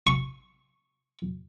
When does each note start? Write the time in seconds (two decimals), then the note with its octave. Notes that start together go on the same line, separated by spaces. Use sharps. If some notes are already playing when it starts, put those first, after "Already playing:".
0.07 C#6